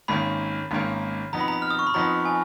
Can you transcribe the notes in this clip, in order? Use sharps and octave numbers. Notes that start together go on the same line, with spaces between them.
G#1 G#2 D#3 A#3 C#4 B5
G#1 G#2 D#3 A#3 C#4
F2 F3 B3 D#4 A#5
B5
A#5
F6
D#6
C#6
B5
F2 F3 B3 D#4 A#5
G#5